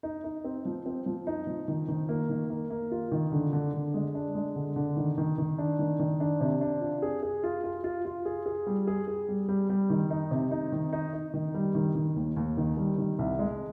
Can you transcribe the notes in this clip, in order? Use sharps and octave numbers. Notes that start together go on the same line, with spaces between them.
D#4
D#4
C4
F3
C4
F3
D#4
F3
D#3
D#3
A#3
D#3
A#3
A#3
F4
D#3
D3
D3
D3
G#3
D4
G#3
D3
D3
D#3
D#3
D#3
D4
D#3
D#3
D4
C3
D4
F4
G#4
G#4
F4
F4
F4
F4
G#4
G#4
G3
G#4
G#4
G3
G3
G3
D#3
D#4
C3
D#4
D#3
D#4
D#4
D#3
G3
D#3
D#3
D#2
D#2
D#3
G3
D#3
C2
G#3